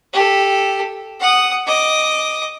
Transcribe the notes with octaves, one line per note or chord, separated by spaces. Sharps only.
G4 A4
F#5 D#6
D#5 D6